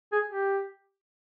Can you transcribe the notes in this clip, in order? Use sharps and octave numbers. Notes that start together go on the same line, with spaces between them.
G#4
G4